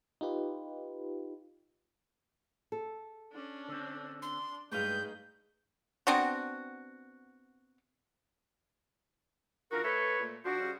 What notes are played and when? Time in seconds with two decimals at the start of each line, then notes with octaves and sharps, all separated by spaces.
0.21 D#4 F4 G4 B4
2.72 A4
3.33 C#4 D4
3.68 D3 C4
4.22 D4 C6
4.72 G2 G#3 A3 D#4 G#4 B4 F5 G6
6.07 B3 C4 D4 F#4
9.71 D3 D#3 F4 F#4 A#4
9.84 A3 A4 B4 C#5
10.19 A#2 A3
10.45 F3 D4 F#4 C5
10.60 C#3 G3